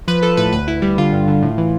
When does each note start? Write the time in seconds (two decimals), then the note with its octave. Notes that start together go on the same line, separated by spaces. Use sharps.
0.08 F3 B4
0.23 F3 A4
0.37 A2 B4
0.53 D2 B4
0.67 D2 E4
0.82 G3 E4
0.98 D3 F4
1.13 G2
1.28 D3
1.43 A2
1.58 E3